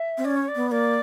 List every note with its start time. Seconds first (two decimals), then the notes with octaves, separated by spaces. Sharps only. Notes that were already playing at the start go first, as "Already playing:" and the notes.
Already playing: E5
0.18 C4
0.25 C#4 D5
0.36 C#5
0.48 D5
0.56 B3
0.70 A#3 D5